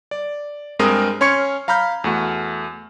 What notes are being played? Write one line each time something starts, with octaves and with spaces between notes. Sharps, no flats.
D5
G2 G#3 C4 A#4 D#6 F6
C#4 C#5 C6 C#6 G#6 C#7
F5 A#5 B5 F6 G6
E2 A3 F#4